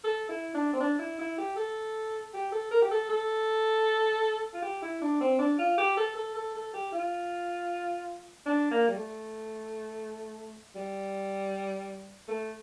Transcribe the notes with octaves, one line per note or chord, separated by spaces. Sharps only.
A4
E4
D4
C4
D4
E4
E4
G4
A4
G4
A4
A#4
G4
A4
A4
F4
G4
E4
D4
C4
D4
F4
G4
A4
A4
A4
A4
G4
F4
D4
A#3
G3
A3
G3
A3